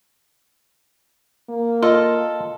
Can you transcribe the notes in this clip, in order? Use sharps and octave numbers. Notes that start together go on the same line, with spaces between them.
A#3
F4 A4 D#5